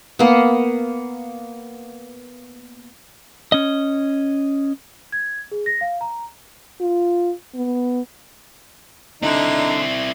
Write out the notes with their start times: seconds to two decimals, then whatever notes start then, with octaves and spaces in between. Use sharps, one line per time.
0.19 A#3 B3
3.52 C#4 D#5
5.12 G#6
5.51 G#4
5.66 A#6
5.81 F5
6.01 A#5
6.80 F4
7.55 B3
9.22 D3 C4 D#4 E4